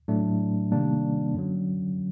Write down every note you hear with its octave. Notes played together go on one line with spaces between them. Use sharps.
A2 F#3 A3 D4
C3 D#3 G3 A#3 D4
F#2 D3 F#3